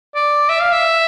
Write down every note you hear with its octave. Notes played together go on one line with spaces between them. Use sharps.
D5
E5
F5
E5